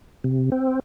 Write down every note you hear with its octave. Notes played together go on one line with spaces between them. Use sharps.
C3
C4